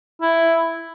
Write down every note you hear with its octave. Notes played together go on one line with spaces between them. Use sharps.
E4